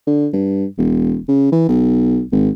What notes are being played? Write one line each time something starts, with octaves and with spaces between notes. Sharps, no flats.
D3
G2
E1
C#3
E3
B1
G#1